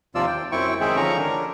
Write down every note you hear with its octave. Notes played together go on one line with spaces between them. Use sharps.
D#2 C3 F3 F4 D5 E6
G5
F#2 C4 E4 G5 C#6
D#3 G#3 C4 G#4 E5 G5
D3 D#3 F3 C#4 A#5 C#6
D4 A#4